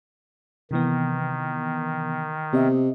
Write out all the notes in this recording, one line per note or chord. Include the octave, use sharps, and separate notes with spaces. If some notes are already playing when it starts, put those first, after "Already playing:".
C3 D#3 E3 B3
C3 B3 D#5 E5